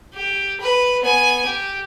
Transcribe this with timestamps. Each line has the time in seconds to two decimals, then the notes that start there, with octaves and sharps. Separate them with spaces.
0.15 G4
0.61 B4
1.02 B3 G#5
1.46 G4